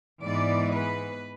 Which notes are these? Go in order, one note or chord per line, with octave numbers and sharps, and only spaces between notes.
G#2 E3 G#3 B3 D5
B4